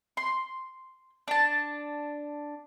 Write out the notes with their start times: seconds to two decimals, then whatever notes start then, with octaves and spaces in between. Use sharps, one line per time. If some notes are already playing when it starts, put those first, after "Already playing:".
0.17 C6
1.28 D4 A5